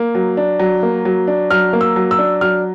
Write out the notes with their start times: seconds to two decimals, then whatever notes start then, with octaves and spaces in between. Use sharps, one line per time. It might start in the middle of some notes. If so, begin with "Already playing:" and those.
Already playing: A#3
0.15 F#3
0.37 D4
0.59 F#3
0.83 A#3
1.05 F#3
1.28 D4
1.51 F#3 F6
1.73 A#3
1.81 E6
1.96 F#3
2.11 E6
2.18 D4
2.41 F#3 F6